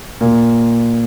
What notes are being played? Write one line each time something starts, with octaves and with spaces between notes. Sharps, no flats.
A#2